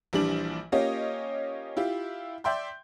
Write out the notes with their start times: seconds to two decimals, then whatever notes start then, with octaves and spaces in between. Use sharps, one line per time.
0.13 A#1 E3 G3 D4 F#7
0.72 A#3 C#4 F4 G4 C#5 D#5
1.77 E4 F4 G4
2.44 D5 E5 G5 C6 G6